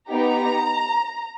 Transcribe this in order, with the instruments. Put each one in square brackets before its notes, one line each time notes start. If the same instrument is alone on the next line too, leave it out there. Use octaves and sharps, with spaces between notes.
[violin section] B3 D#4 G4 A#5